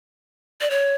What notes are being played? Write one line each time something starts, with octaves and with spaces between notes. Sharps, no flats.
D5
C#5